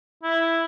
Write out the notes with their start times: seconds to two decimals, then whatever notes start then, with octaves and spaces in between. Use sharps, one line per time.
0.23 E4